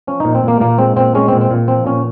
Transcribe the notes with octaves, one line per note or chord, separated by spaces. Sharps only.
F3 C#4
A#2 D#4
C4
A#2 A#3
A#2 A#3
G#3 C4
A#2 C4
G#3 C#4
C4
A#2
C4
A#2
F3 C4
A#2 C#4